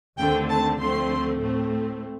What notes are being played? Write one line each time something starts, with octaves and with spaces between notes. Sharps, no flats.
D#2 D3 A3 C4 G5
A5
D2 D3 F3 A3 C4 C6
A2 A3 C4